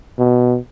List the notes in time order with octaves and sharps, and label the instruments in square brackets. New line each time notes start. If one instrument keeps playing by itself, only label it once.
[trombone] B2